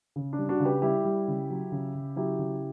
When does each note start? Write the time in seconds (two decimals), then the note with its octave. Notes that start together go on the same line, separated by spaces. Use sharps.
0.16 C#3
0.33 D4
0.39 G3
0.49 D4 F#4
0.60 C#3
0.65 G4 B4
0.82 G3 E4 G4
1.05 G3
1.28 C#3
1.50 F#3
1.72 C#3
1.95 C#3
2.16 F#3 E4 G4
2.39 C#3